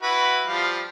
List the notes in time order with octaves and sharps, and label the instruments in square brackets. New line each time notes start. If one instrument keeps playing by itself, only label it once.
[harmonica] E4 F#4 B4
F3 G3 F5